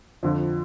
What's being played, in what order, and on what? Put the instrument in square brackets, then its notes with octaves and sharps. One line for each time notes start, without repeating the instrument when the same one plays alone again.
[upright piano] F2 D3 F3